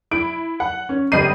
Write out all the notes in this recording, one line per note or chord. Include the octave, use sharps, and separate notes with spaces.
E4 D7
F#5
C#4
G1 G3 D#5 C7 D#7